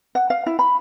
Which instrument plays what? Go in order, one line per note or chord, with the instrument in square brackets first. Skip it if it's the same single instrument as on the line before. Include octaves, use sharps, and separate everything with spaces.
[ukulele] F#5
F5
E4
B5